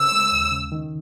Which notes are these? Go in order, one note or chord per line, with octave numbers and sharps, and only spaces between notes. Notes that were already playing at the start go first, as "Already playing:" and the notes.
Already playing: C#3 E6
G#3
D#2
C#3
D#3